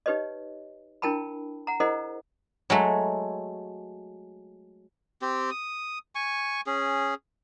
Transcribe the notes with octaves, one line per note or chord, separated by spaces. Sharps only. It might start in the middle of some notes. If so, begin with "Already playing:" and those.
D#4 G4 B4 C#5 D#5
D4 E4 A#4 G5 A5 B5
F#5 A#5
E4 G#4 A#4 C5 D#5 F#5
F#3 G#3 A3
C4 G4
D#6
G#5 C#6
C#4 G#4